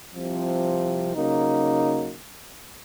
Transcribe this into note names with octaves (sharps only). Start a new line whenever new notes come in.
C2 C3 F3
C#3 F#3 A#3 D#4